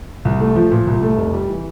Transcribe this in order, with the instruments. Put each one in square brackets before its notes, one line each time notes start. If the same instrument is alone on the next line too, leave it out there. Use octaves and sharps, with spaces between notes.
[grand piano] C2
A3
F3
A#2
C2
A3
F1
G3
E3